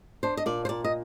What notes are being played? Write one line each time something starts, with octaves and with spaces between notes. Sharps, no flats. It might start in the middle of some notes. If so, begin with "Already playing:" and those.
D4 C5
D#5
A#2 D5
C5
A#2 D5
D#5